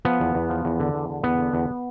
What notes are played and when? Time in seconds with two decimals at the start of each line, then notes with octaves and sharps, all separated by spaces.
0.05 F3 B3
0.20 E2
0.35 E2
0.50 F3
0.65 E2
0.80 D3
0.94 E2
1.09 D3
1.23 E2 B3
1.38 D3
1.53 E2